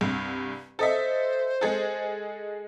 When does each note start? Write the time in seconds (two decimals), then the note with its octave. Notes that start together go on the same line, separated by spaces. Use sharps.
0.01 C2 G2
0.79 A4 C5 D#5 E5
1.61 G#3 G#4 A4